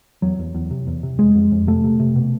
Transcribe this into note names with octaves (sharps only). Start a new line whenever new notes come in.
E2 F#3
E2
E2
C3
E2
C3
F2 G#3
F2
F2
C3 A3
C3
C3
B2